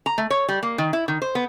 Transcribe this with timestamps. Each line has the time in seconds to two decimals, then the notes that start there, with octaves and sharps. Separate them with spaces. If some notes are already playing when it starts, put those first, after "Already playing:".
0.06 A#5
0.18 A3
0.31 C#5
0.49 G3
0.63 A#3
0.78 D#3
0.93 E4
1.08 D#3
1.22 C5
1.35 B3